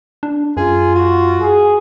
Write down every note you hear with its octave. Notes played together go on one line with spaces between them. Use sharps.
D4
F#2 F4 G#4
F#4
G#4